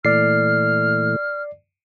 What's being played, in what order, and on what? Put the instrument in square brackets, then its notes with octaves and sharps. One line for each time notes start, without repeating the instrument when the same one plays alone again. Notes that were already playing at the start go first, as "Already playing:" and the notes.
[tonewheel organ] A#2 E3 A3 [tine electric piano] D5 C7 [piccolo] F6